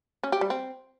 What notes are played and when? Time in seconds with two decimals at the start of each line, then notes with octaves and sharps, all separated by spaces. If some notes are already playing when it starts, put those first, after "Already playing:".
0.23 C#4
0.32 G4
0.41 G3
0.50 C4